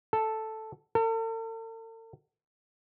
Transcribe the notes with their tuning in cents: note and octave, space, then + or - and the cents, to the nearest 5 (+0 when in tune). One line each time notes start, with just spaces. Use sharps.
A4 +0
A4 +45